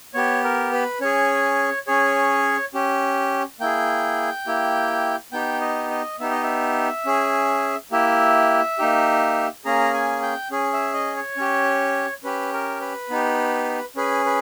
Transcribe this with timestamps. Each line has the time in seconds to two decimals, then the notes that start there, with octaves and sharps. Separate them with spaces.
0.14 B3 G4 C#5
0.44 A#4
0.73 B4
1.01 C#4 G#4 C#5
1.87 C#4 G#4 C#5
2.74 C#4 G4
3.60 A#3 E4 G#4 G5
4.46 A#3 E4 G4
5.32 B3 D#4 G4 G5
5.61 D#5
5.90 D#5
6.20 B3 D#4 G4 E5
6.31 D#5
6.43 E5
7.06 C#4 G#4
7.92 A#3 E4 G4 E5
8.79 A#3 D#4 G4
9.65 A#3 C#4 G#4 A#5
9.94 G#5
10.22 G5
10.51 C#4 G#4
10.73 E5
10.94 D#5
11.16 C#5
11.37 C#4 G4
12.24 C#4 G4 B4
12.53 A#4
12.81 B4
13.10 B3 D#4 G4
13.96 C#4 G#4 B4
14.25 B4